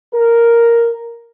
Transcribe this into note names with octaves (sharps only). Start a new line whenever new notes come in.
A#4